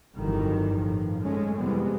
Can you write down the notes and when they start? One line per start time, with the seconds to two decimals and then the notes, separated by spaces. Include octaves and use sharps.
0.14 G1 F2 D#3 E3 F#3 G3
0.73 A2 F3
1.20 F#2 G#3 A3 C#4
1.57 F2 C3 E3 G3 G#3 B3